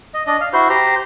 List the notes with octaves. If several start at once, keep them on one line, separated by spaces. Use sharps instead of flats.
D#5
D4 D#5
F5
E4 F#4 C5
G4 C5 A#5